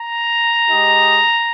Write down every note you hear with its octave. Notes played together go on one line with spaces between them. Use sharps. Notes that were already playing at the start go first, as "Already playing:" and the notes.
Already playing: A#5
G#3 D#4 G4